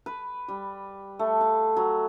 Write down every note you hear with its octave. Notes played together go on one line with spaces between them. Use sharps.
B4
G3
A3
F5
F#3